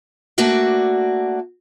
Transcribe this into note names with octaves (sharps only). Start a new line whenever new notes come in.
A3 A#3 D4 F#4 D5